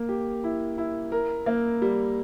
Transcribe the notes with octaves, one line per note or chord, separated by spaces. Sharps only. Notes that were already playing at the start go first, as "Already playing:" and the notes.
Already playing: A#3
G4
E4
E4
A#4
A#3
G3